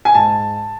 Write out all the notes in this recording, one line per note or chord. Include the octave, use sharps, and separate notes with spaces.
G#5
G#2 A5